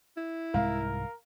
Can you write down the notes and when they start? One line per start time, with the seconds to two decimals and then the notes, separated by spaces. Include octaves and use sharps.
0.17 E4
0.54 C2 G#2 G#3 A#4 F5